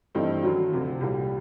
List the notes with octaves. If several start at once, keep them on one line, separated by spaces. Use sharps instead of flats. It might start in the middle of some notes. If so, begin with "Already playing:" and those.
G2 E3 A3 C4 D#4
F#2 D#3 F#3
D2 C3 F3
C2 A#2 G3